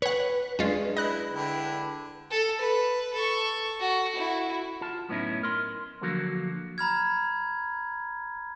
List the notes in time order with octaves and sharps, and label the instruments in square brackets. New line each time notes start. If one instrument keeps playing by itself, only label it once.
[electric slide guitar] B4 [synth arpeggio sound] C#5 F#5
[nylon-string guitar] G#3 D4 [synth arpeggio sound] C#4 F4
[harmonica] E4 [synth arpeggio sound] D#5 F#6
[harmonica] D3 E4 G5
[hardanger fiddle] A4
B4
A4 C#6
F#4
E4 F#4
[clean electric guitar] F4 A5
F#2 A2 B3 C#4 D#4 E4
A#4 C6
D3 F3 F#3 A#3 F#4 A#4
[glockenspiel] A#5 B5 F6 G#6